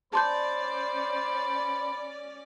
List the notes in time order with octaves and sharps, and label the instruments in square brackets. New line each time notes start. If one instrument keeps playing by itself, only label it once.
[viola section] C#4 D5 [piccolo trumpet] C5 [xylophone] A5 C6 G6 [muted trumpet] B5